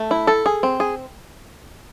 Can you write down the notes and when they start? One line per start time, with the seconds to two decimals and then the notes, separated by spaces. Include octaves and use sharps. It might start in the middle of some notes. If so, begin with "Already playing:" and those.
Already playing: A3
0.11 E4
0.27 A4
0.46 G#4
0.63 C4
0.80 G#4